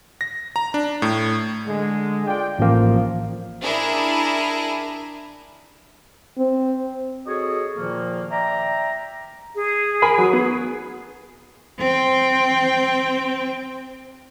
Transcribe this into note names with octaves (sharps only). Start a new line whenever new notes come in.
A#6
A#5
D4
A2
D3 G#3
F4 D5 G5
A1 F3 A#3
D4 E4 G#4 A#4
C4
F#4 G#4 A4 C#5 D#5
A#2 D#3 F3 A#3
D5 E5 G5 A#5
G#4
A#4 G#5 B5
F#3
B3
C4 G5